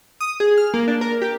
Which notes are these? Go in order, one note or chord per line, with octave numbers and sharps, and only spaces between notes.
D#6
G#4
F6
A#3
D4
A#4
G4